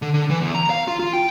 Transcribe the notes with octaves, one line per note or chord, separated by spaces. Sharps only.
D3
D3
E3
E2
A#5
F5
F4
F4
G5